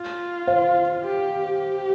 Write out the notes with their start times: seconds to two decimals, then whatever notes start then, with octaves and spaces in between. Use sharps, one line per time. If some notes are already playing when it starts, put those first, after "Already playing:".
Already playing: F4
0.47 C5 F5
1.04 G4
1.59 G4